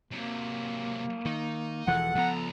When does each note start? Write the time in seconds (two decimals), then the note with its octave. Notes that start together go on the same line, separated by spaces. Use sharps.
0.11 C3 F#3 A#3
1.25 D#3 D#4
1.87 E1 E3 F3 A4 F#5
2.15 C#2 F3 B3 A#5